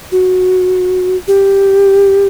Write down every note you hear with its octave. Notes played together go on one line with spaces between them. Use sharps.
F#4
G4